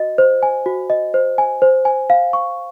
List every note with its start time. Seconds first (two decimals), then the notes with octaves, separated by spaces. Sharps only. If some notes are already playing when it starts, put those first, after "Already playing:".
Already playing: F#4 D#5
0.18 C5
0.43 G#5
0.66 F#4
0.90 D#5
1.14 C5
1.38 G#5
1.62 C5
1.85 G#5
2.10 F5
2.33 C#6